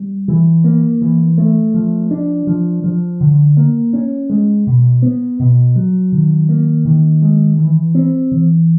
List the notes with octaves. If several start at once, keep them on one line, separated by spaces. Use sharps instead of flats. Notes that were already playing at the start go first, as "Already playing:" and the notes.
Already playing: G3
E3
A#3
E3
A3
F3
D4
F3
F3
D3
A#3
C#4
G#3
B2
B3
B2
F#3
D#3
A#3
D#3
G#3
E3
C4
E3